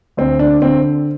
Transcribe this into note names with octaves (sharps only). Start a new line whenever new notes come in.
D2 C4
D4
D3 C4